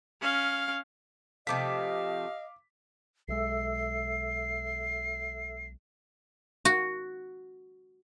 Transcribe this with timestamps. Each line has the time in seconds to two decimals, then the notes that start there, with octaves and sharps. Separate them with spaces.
0.21 C#4 F5
1.47 C3 F3 A3 D#5 F5 D6 B6
3.28 B1 G#3 A4 E5 E6 C7
6.65 F#4